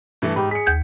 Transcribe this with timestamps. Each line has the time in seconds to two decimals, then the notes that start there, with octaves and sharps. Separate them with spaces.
0.22 G2 E3 A3
0.36 G#2 G4 B5
0.51 G#4 B6 C#7
0.66 D#2 G6 G#6